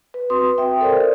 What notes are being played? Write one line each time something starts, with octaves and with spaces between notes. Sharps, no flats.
B4
C4 F#4 B4 C6 D#6
E5 G5
A4 A#4 C5 D5